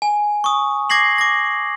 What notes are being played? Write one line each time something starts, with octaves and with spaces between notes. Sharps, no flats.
G#5
C#6 D#6
D6 G#6 A#6 C7 F#7
D6 A#6